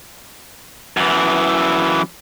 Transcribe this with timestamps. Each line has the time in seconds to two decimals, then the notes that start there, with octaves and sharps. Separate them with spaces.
0.97 F#2 E3